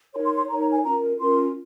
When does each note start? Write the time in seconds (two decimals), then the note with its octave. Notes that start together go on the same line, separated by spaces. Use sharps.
0.13 D#4 A#4 C#5 C6
0.25 C6
0.37 C6
0.48 D#4 A#4 C#5 A#5
0.60 A#5
0.72 G#5
0.84 C#4 F4 A#4 A#5
1.19 C#4 F4 A#4 C6